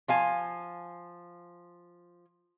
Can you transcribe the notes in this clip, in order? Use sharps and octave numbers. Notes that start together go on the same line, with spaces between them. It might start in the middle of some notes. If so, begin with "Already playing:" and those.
F3 F5 G#5